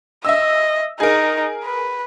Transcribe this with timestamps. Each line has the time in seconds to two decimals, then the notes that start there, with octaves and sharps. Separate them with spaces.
0.25 D#5 E5 E6
1.00 D#4 G#4 A#4
1.64 B4